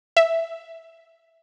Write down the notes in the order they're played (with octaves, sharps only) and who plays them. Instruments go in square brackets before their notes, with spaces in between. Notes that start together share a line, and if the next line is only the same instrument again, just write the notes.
[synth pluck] E5